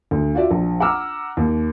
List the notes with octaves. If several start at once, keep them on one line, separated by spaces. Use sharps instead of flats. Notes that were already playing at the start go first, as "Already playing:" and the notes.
D2
F4 F#4 D5 E5
A#1
F#5 A#5 D6 E6 F6
D#2